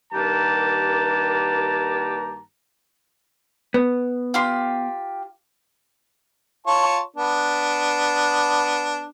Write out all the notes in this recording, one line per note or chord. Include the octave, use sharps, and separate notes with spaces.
G2 D#3 A#3 G4 A5 A#5
B3
F4 G4 C6
F4 C#5 A5
B3 D4